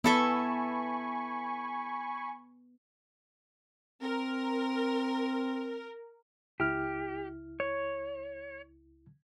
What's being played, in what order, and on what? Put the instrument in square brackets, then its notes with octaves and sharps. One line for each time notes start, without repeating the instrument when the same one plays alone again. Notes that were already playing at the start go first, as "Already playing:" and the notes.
[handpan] B3 [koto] E4 A4 E5 [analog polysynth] G#5 B5 C#6
[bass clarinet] C4 [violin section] A#4
[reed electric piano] C#2 E4 F6 [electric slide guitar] G4
[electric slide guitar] C#5